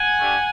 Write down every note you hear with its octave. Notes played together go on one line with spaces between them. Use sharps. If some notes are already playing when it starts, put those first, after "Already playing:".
Already playing: F#5 G#5
A3 D4 G4